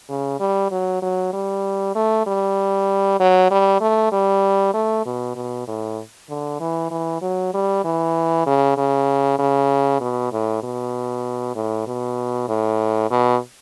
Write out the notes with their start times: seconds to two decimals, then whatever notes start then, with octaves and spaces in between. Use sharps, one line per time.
0.09 C#3
0.40 G3
0.71 F#3
1.02 F#3
1.33 G3
1.95 A3
2.26 G3
3.20 F#3
3.51 G3
3.81 A3
4.12 G3
4.74 A3
5.06 B2
5.36 B2
5.67 A2
6.29 D3
6.60 E3
6.91 E3
7.22 F#3
7.54 G3
7.84 E3
8.46 C#3
8.77 C#3
9.39 C#3
10.01 B2
10.33 A2
10.63 B2
11.55 A2
11.87 B2
12.48 A2
13.10 B2